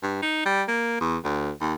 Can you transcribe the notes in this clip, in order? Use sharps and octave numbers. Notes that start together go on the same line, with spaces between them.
G2
D#4
G3
A#3
E2
D2
D#2